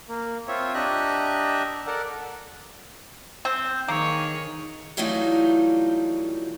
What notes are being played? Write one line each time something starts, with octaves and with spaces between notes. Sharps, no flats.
A#3
C4 F4 C#5 E5
D4 G4 D#5 E5 A#5 F#6
A4 A#4 D5 F#5
C4
D#3 A#3 G#4 C#5
E3 F#3 G3 A3 D#4 F4